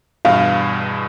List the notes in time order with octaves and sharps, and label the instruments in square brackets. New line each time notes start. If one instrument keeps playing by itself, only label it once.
[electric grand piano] E2 G2 B2 [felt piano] F5